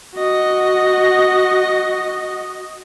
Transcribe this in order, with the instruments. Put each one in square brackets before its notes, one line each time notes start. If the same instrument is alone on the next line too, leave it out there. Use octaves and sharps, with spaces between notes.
[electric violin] F#4 D#5